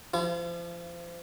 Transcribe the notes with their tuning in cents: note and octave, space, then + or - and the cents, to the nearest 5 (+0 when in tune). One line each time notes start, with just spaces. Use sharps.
F3 -30 F4 -45